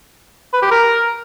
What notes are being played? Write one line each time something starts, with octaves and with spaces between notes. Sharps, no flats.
B4
G4
A#4